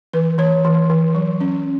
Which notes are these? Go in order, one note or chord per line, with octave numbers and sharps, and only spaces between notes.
E3 B4
E3 C#5
E3
E3
F#3
C#4